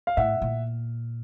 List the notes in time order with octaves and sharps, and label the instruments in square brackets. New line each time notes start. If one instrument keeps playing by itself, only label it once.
[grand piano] F5
[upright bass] A2 [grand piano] E5 F#5
[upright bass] A#2